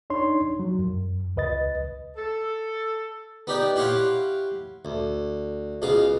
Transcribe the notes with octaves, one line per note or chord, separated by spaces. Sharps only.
D4 D#4 C#5 C6
F#3
F#2
C#2 B4 D#5 A6
A4
B3 D#4 G4 D5 G5
E4 G4 C#5 F5 F#5 C6
D2
C#2 B2 G#4 F5